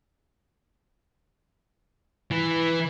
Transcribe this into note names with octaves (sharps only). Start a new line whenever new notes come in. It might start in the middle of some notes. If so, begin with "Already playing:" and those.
E3